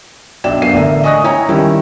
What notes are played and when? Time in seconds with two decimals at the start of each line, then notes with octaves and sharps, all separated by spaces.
0.44 B1 D4 D5 E5 G5 E7
0.62 F#2 B3 D4 F5 C7 D#7
0.74 A1 D3 D4 A#4 E5
1.04 D#5 G#5 C#6 D#6 F#6 A#6
1.24 E4 C#5 G5 G#5 A#5
1.48 D#3 G3 C#4 E4